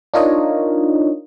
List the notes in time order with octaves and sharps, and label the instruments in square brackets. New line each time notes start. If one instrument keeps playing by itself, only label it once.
[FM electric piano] D4 D#4 F4 A#4 C#5 D#5